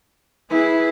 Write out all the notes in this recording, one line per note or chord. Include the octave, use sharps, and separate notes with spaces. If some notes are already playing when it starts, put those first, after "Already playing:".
E4 G#4 B4